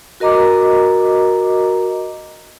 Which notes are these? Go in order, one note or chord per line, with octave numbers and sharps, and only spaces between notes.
F#4 A#4 D#5 A#5 D6